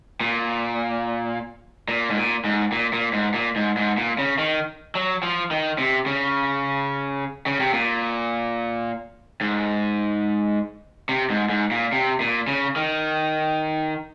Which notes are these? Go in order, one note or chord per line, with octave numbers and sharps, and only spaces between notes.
A#2
A#2
G#2
A#2
G#2
A#2
A#2
G#2
A#2
G#2
G#2
A#2
C#3
D#3
F#3
F3
D#3
C3
C#3
C#3
C3
A#2
G#2
C3
G#2
G#2
A#2
C3
A#2
C#3
D#3